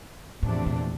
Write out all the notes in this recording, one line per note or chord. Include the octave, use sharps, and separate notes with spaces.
E2 A2 C3 F3 A3 D4
A#2